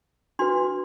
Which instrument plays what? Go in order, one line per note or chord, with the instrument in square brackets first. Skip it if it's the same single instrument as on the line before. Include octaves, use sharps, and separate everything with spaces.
[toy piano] D4 F#4 B4 C6